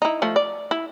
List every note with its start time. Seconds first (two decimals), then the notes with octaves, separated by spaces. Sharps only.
0.02 D#4 E4
0.22 F3 A3
0.36 D5
0.71 E4